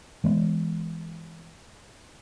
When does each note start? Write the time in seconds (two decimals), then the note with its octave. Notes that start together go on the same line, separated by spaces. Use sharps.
0.24 E3 G#3 B3